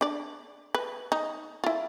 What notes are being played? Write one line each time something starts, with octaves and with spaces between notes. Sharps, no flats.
D4 D5
B4
D#4
E4 F4